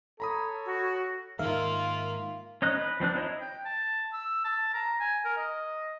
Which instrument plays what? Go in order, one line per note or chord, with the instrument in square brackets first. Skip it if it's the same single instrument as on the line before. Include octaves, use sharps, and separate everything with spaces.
[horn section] A4 C#5 [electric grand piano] A#5 B5 D#6
[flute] F#4
[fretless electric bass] G#2 D#3 G#3 [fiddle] A#3 F4 [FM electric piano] A#4 E5 F5
[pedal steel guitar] C#4 D#4 D#5 F#6
B4
F3 C4 D4 F#6
D#4 E4 C#5 D#5
[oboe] G5
A5
E6
A5
A#5
G#5
A#4
D#5